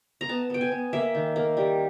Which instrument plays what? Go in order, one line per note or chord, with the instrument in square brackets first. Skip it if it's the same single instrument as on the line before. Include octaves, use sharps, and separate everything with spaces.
[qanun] A#5
B3 A5
B3 G5
G#5
B3
A#3 E5
D#3
A#3
G3